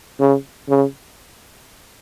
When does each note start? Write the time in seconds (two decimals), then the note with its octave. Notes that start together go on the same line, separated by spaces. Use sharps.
0.20 C#3
0.69 C#3